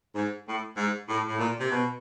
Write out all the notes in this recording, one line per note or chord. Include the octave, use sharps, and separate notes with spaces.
G#2
A2
G#2
A2
A2
A#2
C3
B2